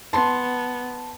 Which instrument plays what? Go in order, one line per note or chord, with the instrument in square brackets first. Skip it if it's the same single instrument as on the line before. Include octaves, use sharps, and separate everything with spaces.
[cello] B3 [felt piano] A5 C6